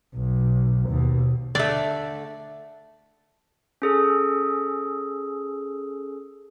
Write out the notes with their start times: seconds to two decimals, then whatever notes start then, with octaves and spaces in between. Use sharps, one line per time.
0.15 B1
0.89 D#2 B2
1.55 D3 A3 D5
3.82 C#4 G#4 A4